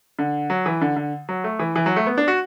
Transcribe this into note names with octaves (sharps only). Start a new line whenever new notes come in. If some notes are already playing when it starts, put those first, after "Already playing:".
D3
F#3
E3
D3
D3
F#3
A3
E3
E3
F#3
A3
B3
D4
F#4